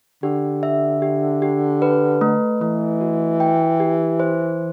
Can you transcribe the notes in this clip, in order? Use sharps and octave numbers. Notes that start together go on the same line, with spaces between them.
D3 G4
E5
G4
G4
B4
A3
E3 A3
F#4
G5
G4
C5